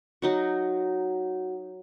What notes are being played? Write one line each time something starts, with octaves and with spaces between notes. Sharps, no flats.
F#3 D#4 F#4